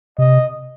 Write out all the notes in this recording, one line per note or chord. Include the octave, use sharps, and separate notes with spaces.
C3 D#5